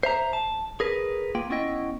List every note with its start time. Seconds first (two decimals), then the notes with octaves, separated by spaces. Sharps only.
0.03 C5 E5 A#5
0.33 A5
0.80 G#4 A#4 B4
1.35 A#3 F4 G5
1.50 B3 C#4 E4 D#5 G5